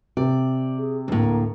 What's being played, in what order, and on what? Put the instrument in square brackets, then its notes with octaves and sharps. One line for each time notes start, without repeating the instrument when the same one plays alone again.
[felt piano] C3 [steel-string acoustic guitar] D5
[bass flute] G#4
[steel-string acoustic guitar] D2 A2 [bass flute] A#3